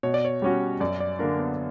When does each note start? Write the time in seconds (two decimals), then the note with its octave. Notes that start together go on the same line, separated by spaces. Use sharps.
0.03 B2 C#5
0.14 D5
0.25 C#5
0.42 G3 C#4 F#4
0.80 F#2 D5
1.00 D5
1.19 D3 A#3 D4 A#4
1.39 B3